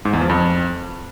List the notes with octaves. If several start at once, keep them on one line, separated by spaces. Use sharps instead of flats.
G#2
E2
F3
F2